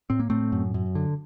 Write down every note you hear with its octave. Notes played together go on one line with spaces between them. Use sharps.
A2 C4
A#3
A2 A3 C4
F#2
F#2
D3